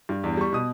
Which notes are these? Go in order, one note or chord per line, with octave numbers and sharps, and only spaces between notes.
G2
E2
G3 C#6
B2 D#6